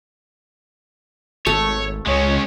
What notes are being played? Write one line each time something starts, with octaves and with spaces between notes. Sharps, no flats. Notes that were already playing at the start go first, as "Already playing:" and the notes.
G#1 A3 C#5
C#2 G#3 C#4 C#5